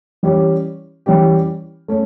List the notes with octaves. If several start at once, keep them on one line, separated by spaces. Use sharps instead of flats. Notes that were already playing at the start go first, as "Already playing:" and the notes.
E3 G3 C#4 G4
E3 G3 C#4 G4
A3 C#4